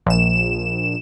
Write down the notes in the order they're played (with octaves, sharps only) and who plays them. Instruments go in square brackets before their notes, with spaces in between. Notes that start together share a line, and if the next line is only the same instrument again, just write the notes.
[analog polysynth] A#1 E7